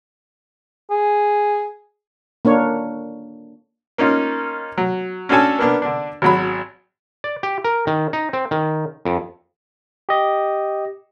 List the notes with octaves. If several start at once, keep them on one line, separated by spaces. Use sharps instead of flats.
G#4
A#3 D4 C#5
A#3 C#4 D#4 F4
F#3
C#4 D4 F#4 A4 G#5 A5
A#3 B3 D4
D3 D4
G#1 F#3 B5
D5
G4
A#4
D#3
D#4
C4
D#3
F2
G4 D#5